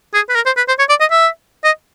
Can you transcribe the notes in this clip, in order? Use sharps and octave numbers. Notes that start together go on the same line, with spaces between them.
G#4
B4
A#4
C5
B4
C5
C#5
D5
D#5
E5
D#5